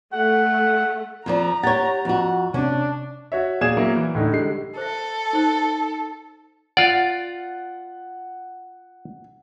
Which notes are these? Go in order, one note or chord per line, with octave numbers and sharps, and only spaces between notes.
A3 F#5
F2 F3 D5 A#5
G4 C#5 F#5 A6
F2 F#4
C3 C#4 D4
F#4 C#5 E5
A#2 G#4 D5 F5 G#6 E7
F#3 A#3 E4
E3
A2 D3 D#4
D3 G3 G#3 C7
A4 C5 E5
D#4 C5
F4 D5 F#5